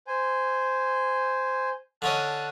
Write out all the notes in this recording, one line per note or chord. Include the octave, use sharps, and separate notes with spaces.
C5 G#5
D3 C#4 D#5 A5 F#6